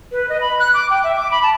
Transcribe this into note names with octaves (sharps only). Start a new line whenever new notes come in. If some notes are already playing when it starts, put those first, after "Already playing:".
B4
D#5
B5
F#6
D6
G5
E5
D6
B5
A5